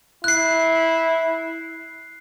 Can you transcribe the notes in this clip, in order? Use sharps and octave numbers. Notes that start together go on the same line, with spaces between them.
E4 F#6 C7